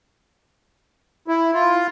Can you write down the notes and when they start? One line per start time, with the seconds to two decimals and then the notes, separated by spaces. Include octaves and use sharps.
1.28 E4
1.54 F4